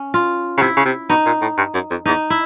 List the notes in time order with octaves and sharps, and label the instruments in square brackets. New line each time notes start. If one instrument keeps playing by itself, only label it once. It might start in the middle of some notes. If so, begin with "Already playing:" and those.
Already playing: [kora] C#4
F4
[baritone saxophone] C#3
[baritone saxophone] C3 [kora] E4
[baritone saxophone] C#3
C3
[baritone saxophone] B2 [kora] D#4
[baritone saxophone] A#2
A2
G2
F#2
F2
[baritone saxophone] E2 [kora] D#4
[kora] E4